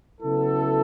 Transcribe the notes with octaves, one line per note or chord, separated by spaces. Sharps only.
C#3 F#3 B3 E4 A4